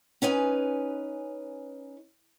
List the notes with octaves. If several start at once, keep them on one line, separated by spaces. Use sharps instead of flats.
C#4 D#4 B4 G#5